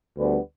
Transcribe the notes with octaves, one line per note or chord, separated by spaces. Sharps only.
D2 D3 G3 B3 B4